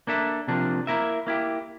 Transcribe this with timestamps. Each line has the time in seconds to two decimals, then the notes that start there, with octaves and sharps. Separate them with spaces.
0.07 A#3 D4 A4 E5
0.48 C3 F3 A#3 D4
0.87 A#3 E4 A#4 E5
1.27 A#3 E4 G4